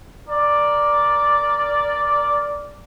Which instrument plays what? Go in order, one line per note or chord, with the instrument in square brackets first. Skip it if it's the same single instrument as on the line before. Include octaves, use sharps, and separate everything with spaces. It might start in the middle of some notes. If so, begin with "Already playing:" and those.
[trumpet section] A#4 D5